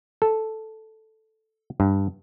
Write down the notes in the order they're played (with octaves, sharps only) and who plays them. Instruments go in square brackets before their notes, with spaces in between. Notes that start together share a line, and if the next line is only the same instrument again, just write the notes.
[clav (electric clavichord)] A4
G2